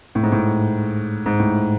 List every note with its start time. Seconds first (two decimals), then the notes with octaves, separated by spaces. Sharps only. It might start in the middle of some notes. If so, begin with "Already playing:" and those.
0.15 A2
0.23 G#2
0.32 A2
1.26 G#2
1.39 A2